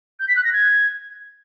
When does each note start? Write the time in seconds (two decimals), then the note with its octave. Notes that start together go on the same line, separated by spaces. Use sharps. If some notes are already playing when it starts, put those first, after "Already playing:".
0.19 G6
0.28 B6
0.36 F#6
0.44 A#6
0.52 G#6